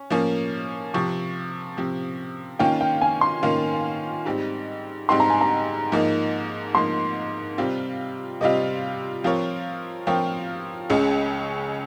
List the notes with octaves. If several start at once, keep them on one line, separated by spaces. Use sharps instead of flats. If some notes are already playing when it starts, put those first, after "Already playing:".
Already playing: C#4
F3 A#3 C#4
C3 F3 C4 C#6
C3 F3 C4
D#3 A#3 C#4 F4 G5
G5
G#5
C6
D#3 A#3 C#4 F4
G#2 G3 C4 D#4 G4
G#2 G3 C4 D#4 G4 C6
A#5
G#5
A#5
G#2 F3 A#3 D#4
G#2 F3 A#3 D#4 C6
C3 G3 C4 F4
C3 G3 C4 F4 D#5
F3 C4 F4 A#4 C#5
F3 C4 F4 A#4 C#5 G5
C#2 C#3 G#3 C#4 G#4